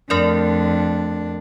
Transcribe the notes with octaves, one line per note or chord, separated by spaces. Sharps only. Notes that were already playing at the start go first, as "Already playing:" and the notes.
F2 A3 D4 A#4 D5